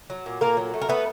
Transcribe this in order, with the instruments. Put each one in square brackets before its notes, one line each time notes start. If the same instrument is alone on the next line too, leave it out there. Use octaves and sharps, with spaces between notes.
[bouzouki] F#3
A#2
A#2 A#3 A#4
F#3
A3
A#4
A3 B3 B4